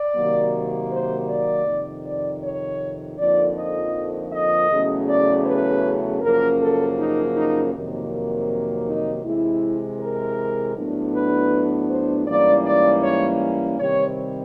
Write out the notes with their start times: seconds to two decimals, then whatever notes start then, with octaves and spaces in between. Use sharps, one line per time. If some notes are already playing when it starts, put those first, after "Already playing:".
Already playing: D5
0.15 C3 D#3 F#3 A#3
0.91 C5
1.29 D5
1.67 F2 C3 D#3
2.05 D5
2.43 C#5
3.18 F2 D3 F3 A#3 D#4 D5
3.56 D#5
4.32 D#5
4.70 E2 C#3 F#3 A3 C#4
5.08 D5
5.45 B4
6.21 F#2 C#3 F3 A#3 C#4 A#4
6.60 A4
6.97 D#4
7.35 D#4
7.73 F2 C3 D#3 F#3 A#3
8.86 D#4
9.24 C3 E3 G#3 E4
10.00 A#4
10.75 A2 F#3 B3 D4
11.13 B4
11.89 C5
12.27 G#2 E3 G3 A#3 C#4 D5
12.65 D5
13.02 C#5
13.78 C3 D#3 G3 C4 C#5